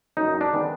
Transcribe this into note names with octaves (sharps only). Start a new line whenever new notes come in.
F#2 D#4
D4
D#3 G#3 B3